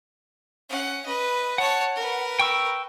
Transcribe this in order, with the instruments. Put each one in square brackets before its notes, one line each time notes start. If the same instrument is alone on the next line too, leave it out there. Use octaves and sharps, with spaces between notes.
[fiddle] C#4 F#5
B4 D#5
[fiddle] C#5 A5 [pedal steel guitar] F#5
[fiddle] A#4 B4
[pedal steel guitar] G5 C#6 E6